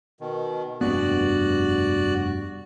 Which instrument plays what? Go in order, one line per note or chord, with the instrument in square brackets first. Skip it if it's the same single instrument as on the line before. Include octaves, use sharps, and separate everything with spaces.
[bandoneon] B2 D#3
[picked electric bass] F1 G2 B3 [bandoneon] F#4 D5 F#6